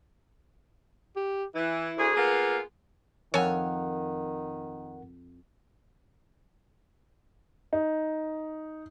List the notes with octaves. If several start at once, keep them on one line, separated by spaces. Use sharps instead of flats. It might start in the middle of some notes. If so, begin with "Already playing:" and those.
G4
E3 E4
D2 G#4
A#3 B3 F4 G#4
F2 D#3 A#4 C#5 F#5 G#5
D#4